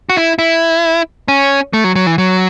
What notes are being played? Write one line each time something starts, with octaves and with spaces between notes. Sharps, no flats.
F#4
E4
E4
C#4
A3
F#3
F#3
E3
F#3